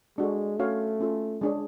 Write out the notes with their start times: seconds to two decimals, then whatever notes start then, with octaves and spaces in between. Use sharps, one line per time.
0.18 G#3 D4 F#4 A4
0.59 A3 C#4 F#4 C#5 F5
1.00 C#4 F4 A4
1.41 G#3 D4 G#4 C#5